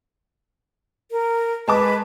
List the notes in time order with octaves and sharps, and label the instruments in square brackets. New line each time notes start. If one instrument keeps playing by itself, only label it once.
[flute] A#4
[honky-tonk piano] G#3 A5 D6 [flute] B4